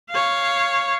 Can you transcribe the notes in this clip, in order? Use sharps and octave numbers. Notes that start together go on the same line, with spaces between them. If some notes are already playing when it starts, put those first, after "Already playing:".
C#5 F5